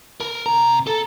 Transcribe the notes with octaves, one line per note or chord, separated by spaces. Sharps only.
A#4
C3 A#5
A4